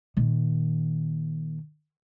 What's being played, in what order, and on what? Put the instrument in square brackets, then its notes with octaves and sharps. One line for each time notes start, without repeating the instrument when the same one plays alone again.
[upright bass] A#2 D#3